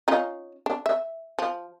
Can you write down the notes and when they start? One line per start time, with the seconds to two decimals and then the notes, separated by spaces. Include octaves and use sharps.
0.08 C#4 D#4 F4
0.66 D4
0.86 E5
1.39 F3